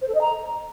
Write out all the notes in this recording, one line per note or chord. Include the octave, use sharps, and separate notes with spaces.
C5
A4
D#5
A#5